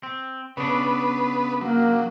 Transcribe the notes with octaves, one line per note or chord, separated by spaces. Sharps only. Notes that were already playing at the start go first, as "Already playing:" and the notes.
C4
C#3 B3 D4 B4
F#3 A#3